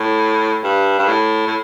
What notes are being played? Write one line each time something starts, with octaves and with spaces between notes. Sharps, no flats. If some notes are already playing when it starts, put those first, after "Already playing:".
Already playing: A2
G2
G2
A2
A2